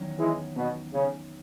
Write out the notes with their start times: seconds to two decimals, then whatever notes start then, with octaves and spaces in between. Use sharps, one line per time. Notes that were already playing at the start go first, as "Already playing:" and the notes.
Already playing: E2 D#3 F#3 C#4
0.19 E3 G#3
0.56 B2
0.93 C#3